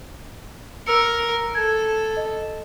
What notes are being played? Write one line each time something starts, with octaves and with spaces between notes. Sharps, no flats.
A#4 E6 C#7
A4 G#6
D#5